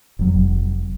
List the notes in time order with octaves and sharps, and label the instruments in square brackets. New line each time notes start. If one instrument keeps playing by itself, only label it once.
[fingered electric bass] F1 F#3